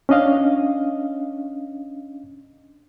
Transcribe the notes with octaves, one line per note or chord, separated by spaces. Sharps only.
C#4 D4 D#5 F5